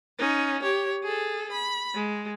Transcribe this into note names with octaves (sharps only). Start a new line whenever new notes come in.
C#4 D#4
G4 C#5
G#4 A4
B5
G#3